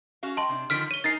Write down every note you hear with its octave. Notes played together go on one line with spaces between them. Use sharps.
C#4 F#4 F5
D#5 G5 A5 C6
C3 D4
D3 D#3 F3 F6 B6 D7
C#5 D#7 G7
D#4 A#4 G#5 A6 C7